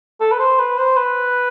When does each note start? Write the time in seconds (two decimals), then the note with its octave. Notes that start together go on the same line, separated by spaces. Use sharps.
0.21 A4
0.32 B4
0.40 C5
0.59 B4
0.78 C5
0.97 B4